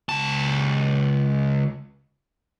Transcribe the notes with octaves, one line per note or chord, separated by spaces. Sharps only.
C#2 A5